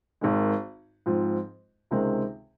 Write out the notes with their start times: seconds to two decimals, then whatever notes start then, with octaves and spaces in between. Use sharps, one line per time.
0.21 G#1 G#2 D#3 G#3
1.06 G#2 F3 C4 F4
1.91 C#2 C3 D#3 G#3 C4